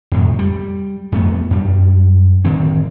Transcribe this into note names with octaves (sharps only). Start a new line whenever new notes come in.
F2 A2 C3
G3
F2 A3 B3
F#2 G3
D1 D#3 C4